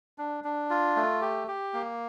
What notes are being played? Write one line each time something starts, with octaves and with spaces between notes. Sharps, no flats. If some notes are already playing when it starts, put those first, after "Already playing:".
D4
D4
F4
A3
G4
G4
A#3